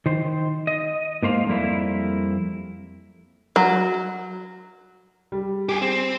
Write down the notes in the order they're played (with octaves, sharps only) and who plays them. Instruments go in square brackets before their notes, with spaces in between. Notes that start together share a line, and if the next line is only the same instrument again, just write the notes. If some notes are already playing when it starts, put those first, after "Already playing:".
[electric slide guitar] D#3 C5
D#5
G#2 A#3 C5 F5
F2 G3 A#3 E4
[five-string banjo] F#3
[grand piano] G3
[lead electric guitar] G4 G#4
C4